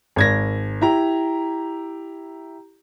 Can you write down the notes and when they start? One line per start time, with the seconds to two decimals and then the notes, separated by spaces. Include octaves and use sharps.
0.16 G#1 G#6 A#6
0.82 E4 G4 A#5